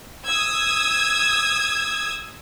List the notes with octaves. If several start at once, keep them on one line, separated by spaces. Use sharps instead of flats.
D#6 E6 G#6